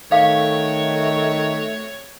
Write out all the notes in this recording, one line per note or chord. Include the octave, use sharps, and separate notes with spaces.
D#3 A3 C4 F#4 C#5 F5